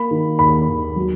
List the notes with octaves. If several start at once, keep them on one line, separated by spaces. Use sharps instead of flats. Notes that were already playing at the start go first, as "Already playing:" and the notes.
Already playing: A#3 B5
D#3
D#2 B5
D#2
F#3